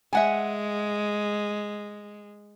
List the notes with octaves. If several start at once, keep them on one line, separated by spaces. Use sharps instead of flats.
G#3 E5 F#5 G#5